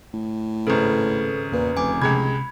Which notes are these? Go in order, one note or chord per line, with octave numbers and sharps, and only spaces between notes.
A2
G#1 C#3 A4 B4
E2 A#2 B4
F1 G#5 D6
C#2 C3 G#3 B5 G#6